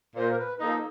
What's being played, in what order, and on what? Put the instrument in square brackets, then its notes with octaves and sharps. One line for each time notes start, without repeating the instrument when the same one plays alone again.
[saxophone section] A#2 [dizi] C5
[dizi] A#4
B4
[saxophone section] F3 A#3 D#4 [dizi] A4